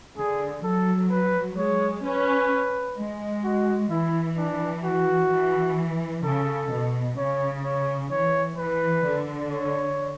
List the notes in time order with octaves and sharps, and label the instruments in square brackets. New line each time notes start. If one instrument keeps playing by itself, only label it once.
[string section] D3 [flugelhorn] G#4
[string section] F#3 [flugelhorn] A4
[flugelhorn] B4
[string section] G#3 [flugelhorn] C#5
[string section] C#4 [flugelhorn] B4
[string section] G#3
[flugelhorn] F#4
[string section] E3 [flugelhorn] E4
[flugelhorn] D4
F#4
[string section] E3
[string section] C#3 [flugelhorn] A4
[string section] B2
[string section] C#3 [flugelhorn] C#5
[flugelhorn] C#5
[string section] E3 [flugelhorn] C#5
[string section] E3 [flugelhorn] B4
[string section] D3
[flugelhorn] C#5